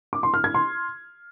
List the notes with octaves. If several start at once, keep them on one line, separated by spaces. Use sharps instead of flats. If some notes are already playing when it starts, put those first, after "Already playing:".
D6
C6
F6
G#6
C6